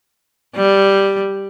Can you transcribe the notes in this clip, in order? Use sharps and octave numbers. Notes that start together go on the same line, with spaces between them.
G3